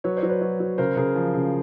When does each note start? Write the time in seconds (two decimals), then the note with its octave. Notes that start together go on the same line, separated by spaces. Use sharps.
0.04 F#3 B4 C#5
0.17 C5 D5
0.23 F#3
0.29 B4 C#5
0.41 F#3
0.60 F#3
0.78 C#3 A#4 C5
0.97 C#3 G#4 A#4
1.16 F3
1.35 C#3